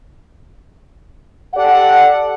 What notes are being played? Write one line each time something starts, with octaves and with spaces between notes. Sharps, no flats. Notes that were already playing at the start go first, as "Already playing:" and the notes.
G4 A4 D5 F#5